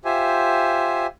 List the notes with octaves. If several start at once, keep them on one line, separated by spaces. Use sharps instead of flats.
F4 G4 C5 E5 G#5